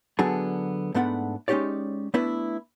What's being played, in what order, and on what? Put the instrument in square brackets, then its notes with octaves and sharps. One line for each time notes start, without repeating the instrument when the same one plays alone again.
[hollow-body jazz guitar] D3 F#3 B3 D4 G#4 A5
G#2 A3 B3 D4 F#5 B5
G#3 C#4 D#4 G4 C#5 D5
A3 B3 D4 E4 B4 E5